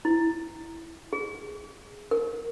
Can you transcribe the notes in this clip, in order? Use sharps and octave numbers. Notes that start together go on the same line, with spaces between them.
E4
G#4
A#4